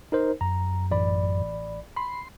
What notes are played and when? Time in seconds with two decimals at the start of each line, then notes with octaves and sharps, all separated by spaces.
0.12 D#4 A#4 C5
0.41 F#2 A#5
0.91 A1 D5 B5
1.97 B5 C6